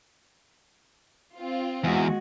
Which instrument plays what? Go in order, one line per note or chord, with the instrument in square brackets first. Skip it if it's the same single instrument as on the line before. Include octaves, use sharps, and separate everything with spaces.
[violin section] C4 F4
[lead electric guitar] E2 [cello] G#3 F#4